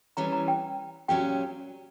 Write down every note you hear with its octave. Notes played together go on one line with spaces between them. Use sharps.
E3 G3 C#4 A#5
A#5
G5
A#2 F#3 C#4 G4 G5